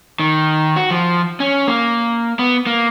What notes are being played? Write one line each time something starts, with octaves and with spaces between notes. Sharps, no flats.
D#3
F#4
F3
C#4
A#3
B3
A#3